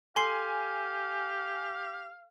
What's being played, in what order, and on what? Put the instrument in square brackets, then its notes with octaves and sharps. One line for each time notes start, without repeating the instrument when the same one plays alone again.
[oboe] G4 [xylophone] A4 C6 C7 [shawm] F5 [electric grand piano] G#5